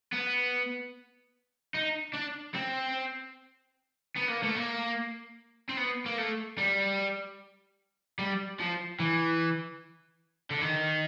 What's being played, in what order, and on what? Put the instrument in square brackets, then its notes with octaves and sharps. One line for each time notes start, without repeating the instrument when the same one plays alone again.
[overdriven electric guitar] B3
D#4
D4
C4
B3
A#3
A3
A#3
C4
B3
A#3
A3
G3
G3
F3
E3
D3
D#3